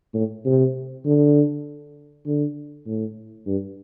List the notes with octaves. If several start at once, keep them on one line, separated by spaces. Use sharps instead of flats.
A2
C3
D3
D3
A2
G2